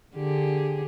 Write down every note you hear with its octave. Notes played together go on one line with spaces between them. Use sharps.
D3 G4 G#4